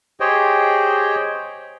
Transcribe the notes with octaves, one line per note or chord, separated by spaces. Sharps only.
G4 G#4 C5 C#5 D#5 G5